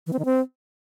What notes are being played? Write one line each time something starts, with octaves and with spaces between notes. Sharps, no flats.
E3
C4
D#3
C4